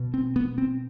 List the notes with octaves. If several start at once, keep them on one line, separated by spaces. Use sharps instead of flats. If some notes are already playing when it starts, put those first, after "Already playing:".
Already playing: B2
C4
B3
C4